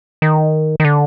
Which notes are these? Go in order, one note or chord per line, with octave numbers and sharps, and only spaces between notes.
D#3
D#3
D3